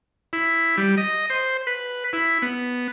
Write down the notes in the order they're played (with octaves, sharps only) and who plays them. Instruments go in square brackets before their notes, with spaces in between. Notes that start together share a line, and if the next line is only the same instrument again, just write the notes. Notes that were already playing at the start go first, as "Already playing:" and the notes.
[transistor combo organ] E4
G3
D#5
C5
B4
E4
B3